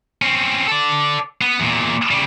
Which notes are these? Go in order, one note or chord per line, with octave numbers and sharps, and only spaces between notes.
C4 C#4
A4 D5
B3
E2 A#2
C#3 G3